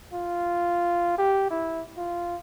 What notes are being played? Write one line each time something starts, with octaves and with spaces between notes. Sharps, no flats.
F4
G4
E4
F4